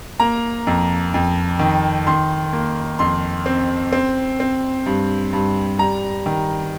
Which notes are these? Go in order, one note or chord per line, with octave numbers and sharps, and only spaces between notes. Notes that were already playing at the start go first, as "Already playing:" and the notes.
A#3 A#5
F2
F2
D#3
D#3 C6
A#3
F2 C6
C4
C4
C4
G2
G2
G3 A#5
D#3